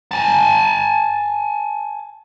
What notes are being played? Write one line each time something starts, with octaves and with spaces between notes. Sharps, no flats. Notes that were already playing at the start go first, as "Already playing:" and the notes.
G#5 A5